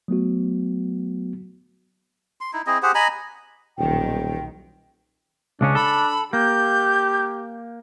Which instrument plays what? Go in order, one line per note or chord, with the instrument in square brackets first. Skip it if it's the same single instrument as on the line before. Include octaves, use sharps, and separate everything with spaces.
[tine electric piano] F#3 A3 B3 F#4
[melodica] C6
D#4 E4
C4 E4 G#4 D#5
G4 G#4 C5 F#5
D#5 G#5 A#5 B5
[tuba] D#1 [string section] B1 D#3 [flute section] G5
[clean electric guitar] C#2 C#3 C#4 [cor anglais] D4
[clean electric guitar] A4 [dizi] B5
[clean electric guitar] A#3 [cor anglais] G4 [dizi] G6